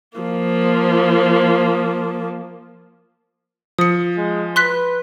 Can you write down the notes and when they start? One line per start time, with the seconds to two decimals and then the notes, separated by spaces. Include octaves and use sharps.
0.17 F3 A#3
3.78 F3 D#6 C#7
4.17 G#3
4.56 B4 C6 F#6 B6